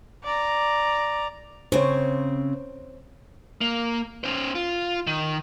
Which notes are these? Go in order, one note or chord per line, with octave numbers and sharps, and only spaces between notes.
D5 A#5
C#3 C4 C5 C#5
A#3
C#4 C5
F4
D#3